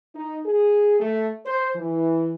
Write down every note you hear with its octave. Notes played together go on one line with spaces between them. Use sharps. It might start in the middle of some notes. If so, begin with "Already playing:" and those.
D#4
G#4
A3
C5
E3